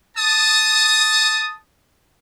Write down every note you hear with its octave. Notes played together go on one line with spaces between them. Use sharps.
A5 D#6